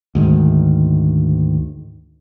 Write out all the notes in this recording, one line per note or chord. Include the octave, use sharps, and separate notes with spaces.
D2 G#2 D#3